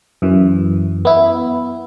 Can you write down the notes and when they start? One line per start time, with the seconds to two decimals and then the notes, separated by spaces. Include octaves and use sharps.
0.22 F#2 E3
1.05 B3 E4